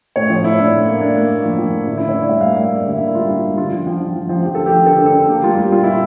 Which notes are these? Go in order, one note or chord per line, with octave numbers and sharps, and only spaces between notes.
A2 C#5
F3
A2 E4
A2 D4
A2
A#3
A#3 D4
A#3
A#3
F3
F3
A2
D3 E4
E4
D3
C#5
D3 D5
G3 E5
F5
A#3
E5
A#3 D5
G3 D5
D3
E5
A#3
E4
G3 F4
D3
G3
D3 F4
F3
F3
F3
F3
F3
F3 G4
D3 A4
G4
F3
D3 A4
D3 G4
A4
D3
A#3 G4
G3 F4
G4
G3
A#2 F4
A#2 E4